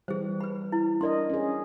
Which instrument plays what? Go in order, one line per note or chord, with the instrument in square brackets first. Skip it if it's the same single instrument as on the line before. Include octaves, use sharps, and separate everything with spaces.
[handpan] E3 G3 [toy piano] G#4 C5
[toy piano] B4 B5
E4
[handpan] D4 A#4 D#5 [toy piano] D5 C6
[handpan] C#4 G#4